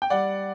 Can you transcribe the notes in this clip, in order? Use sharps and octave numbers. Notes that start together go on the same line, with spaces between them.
G5
G3 D5 F#5